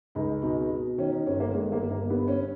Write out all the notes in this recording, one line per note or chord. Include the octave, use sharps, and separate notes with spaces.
C#2 D#4
B2 D#4
B2
D#3 C#4
D#4
G1 C#4
A#3
G1 G#3
A#3
G1
A#3
G2 B3
C#4